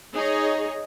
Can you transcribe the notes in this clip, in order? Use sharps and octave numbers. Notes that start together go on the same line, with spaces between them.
D#4 G#4 C#5 D#5